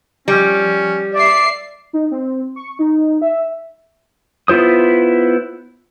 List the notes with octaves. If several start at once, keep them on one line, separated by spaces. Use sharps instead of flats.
F3 G3 C#4
D5 E5 C7
D#4
C4
C#6
D#4
E5
B3 E4 F4 C5 D#6